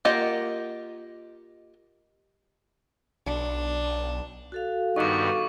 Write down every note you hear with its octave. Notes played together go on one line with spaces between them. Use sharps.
A#3 F4 G4 D#5 F#5
B1 D4
F#4 A4 F5
G2 D#3 B3 D#4 D#5 F#5 C#6 D6